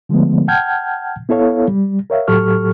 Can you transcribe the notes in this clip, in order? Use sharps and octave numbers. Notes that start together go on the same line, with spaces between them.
D3 F3 G#3 A3 B3
F#5 G5 A5 F6 G6 G#6
B3 E4 A4 C#5 F5
G3
A#4 C#5 E5 F5
A2 F#3 G4 A4 C#6 F6